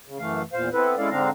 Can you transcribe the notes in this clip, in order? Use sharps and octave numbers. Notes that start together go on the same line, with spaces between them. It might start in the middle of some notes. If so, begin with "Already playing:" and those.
C#3
F#2 E3 A3 F5
E2 A#2 C5 F5
B3 C4 E4 A4 B4
G#3 C#4 E4 A4 D5 F5
G#2 D3 C4 D4 F5 A#5